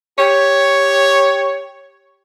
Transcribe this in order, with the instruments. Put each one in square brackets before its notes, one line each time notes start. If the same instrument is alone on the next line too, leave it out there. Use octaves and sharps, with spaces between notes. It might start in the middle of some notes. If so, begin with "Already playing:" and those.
[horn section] G4 C#5